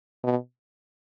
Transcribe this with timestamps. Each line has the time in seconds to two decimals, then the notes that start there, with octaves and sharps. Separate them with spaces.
0.24 B2